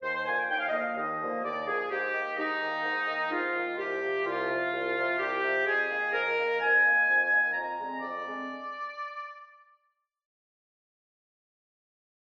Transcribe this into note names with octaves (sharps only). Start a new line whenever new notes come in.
D#2 C5
C5
D3 F3 A#3 G#5
G5
D#2 G5
F5
D#5
D3 F3 A#3 F5
D#2 D#5
D3 F3 A#3
D#2 D5
D3 F3 A#3 G#4
G#2 G4
D#3 A#3
G#2 D#4
D#3 A#3
G#2
D#3 A#3
G#2 F4
D#3 A#3
C2 G4
C3 F3
C2 F4
C3 F3
C2
C3 F3
C2 G4
C3 F3
F2 G#4
D#3 A#3
F2 A#4
D#3 A#3
F2 G#5
D#3 A#3
F2
D#3 A#3
F2 A#5
D3 G#3 C4
F2 D5
D3 G#3 C4